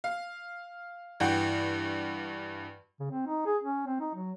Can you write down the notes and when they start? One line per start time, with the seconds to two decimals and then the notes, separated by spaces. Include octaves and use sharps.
0.04 F5
1.20 G2 E3 F#4 G5
3.00 C#3
3.11 C4
3.27 D#4
3.46 G#4
3.64 C#4
3.86 C4
4.00 D#4
4.15 F#3